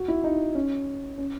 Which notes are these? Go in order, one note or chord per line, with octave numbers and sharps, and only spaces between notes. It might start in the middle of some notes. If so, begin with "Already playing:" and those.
Already playing: F#4
E4
D#4
C#4
C#4